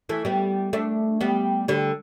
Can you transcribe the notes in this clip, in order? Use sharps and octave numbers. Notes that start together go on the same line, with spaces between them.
E3 A3
G3 B3
A3 D4
G3 B3
D3 G3